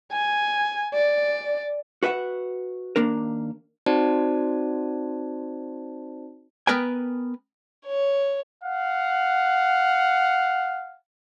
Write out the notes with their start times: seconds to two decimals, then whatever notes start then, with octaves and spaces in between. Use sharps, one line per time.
0.12 G#5
0.94 D5
2.03 F#4 B4 E5 F#5
2.96 D#2 A#3 D4 A#4
3.86 C4 D#4 F#4 C5 D5 A5
6.67 B3 A#4 B4 G5 G#5
7.86 C#5
8.63 F5 F#5